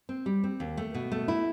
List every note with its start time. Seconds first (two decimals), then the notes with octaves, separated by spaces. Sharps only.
0.09 C4
0.26 G3
0.44 C4
0.60 D#2
0.77 A3
0.94 B2
1.12 A3
1.28 E4